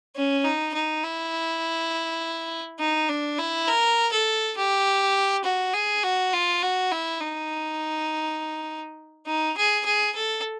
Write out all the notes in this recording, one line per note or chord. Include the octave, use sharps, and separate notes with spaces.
C#4
D#4
D#4
E4
D#4
D4
E4
A#4
A4
G4
F#4
G#4
F#4
F4
F#4
E4
D#4
D#4
G#4
G#4
A4